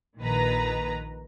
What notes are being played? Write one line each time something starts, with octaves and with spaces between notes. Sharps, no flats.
A#1 D#3 B4 A#5